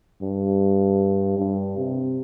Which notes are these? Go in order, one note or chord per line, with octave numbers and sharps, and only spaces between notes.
G2
G2
C3